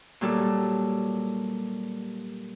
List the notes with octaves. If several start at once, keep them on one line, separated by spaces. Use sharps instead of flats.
A#2 F#3 G3 A4